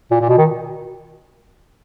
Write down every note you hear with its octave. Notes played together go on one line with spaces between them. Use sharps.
A#2
A#2
B2
D#3